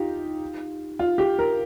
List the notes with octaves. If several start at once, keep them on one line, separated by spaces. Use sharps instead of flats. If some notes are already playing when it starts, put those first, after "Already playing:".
Already playing: D#4 F4 G4
F4
G4
A#4